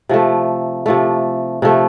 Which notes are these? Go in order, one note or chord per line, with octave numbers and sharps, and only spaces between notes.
C3 F3 A3
C3 F3 A3
C3 F3 A3